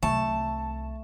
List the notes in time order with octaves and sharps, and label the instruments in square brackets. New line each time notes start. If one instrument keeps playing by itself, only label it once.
[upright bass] C2 C3 [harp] A3 [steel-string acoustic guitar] A5